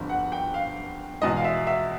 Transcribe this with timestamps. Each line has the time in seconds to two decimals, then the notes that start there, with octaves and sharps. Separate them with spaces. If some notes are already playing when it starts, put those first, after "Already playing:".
Already playing: G1 F2 D3
0.09 F#5
0.32 G5
0.54 F5
1.22 E2 B2 G#3 D#5
1.37 F5
1.44 E5
1.67 E5